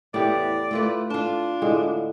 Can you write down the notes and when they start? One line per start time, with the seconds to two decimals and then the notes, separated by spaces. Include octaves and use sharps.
0.14 E2 A2 B3 G4 D5
0.71 A3 F4 B4
1.10 D4 F4 A5
1.62 A2 D3 G#3